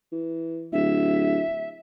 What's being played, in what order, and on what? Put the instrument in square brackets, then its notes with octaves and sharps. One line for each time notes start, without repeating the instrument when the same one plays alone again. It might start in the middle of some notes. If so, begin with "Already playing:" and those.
[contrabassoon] E3
[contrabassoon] D1 [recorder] E5